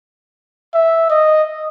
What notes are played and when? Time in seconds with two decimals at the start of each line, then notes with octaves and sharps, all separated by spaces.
0.74 E5
1.10 D#5